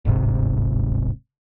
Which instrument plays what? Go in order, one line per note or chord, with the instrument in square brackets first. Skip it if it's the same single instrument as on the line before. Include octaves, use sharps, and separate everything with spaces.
[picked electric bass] D1 G1 G#2 C3